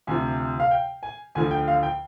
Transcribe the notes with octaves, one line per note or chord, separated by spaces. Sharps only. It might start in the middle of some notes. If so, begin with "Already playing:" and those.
D2 C3 F3 G#5
F5
G5
G#5
D2 D3 F3 G#5
G5
F5
G5